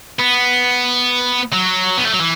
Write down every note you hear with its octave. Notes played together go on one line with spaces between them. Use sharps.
B3
F#3
B3
A3
F#3
E3